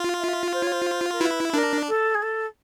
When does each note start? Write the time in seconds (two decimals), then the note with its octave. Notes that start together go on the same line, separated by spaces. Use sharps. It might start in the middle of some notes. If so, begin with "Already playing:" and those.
Already playing: F4
0.19 E5
0.53 C5
0.63 C#5
0.72 C5
1.12 A#4
1.20 E4 B4
1.54 D4 A#4
1.88 A4
2.14 G#4
2.22 A4